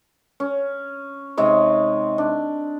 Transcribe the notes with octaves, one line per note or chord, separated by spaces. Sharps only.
C#4
C3 G#3 D#4 C#5
D4